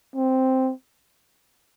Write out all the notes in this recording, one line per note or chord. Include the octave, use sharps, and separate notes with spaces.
C4